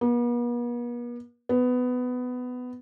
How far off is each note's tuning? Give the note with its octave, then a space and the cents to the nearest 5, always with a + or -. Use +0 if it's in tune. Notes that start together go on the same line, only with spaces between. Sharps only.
B3 -45
B3 +15